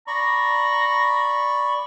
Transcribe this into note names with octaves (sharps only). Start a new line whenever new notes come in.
D5 A#5 B5 C#6